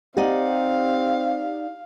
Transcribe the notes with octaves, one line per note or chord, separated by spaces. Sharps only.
C4 D#4 G4 D5 F5 F#5